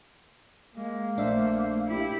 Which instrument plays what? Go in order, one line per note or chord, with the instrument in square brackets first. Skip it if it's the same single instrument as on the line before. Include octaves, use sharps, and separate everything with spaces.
[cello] G#3 [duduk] A#3
[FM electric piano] A#1 D4 E5 [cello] A3 C5
[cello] E4 G4